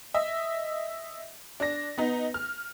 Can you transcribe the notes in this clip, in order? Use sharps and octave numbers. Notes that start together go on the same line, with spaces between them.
D#5 E5
D4 A#6
B3 D#4
F6